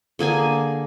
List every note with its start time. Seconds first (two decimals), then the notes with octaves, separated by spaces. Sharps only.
0.19 D3 A#3 G#4 G#5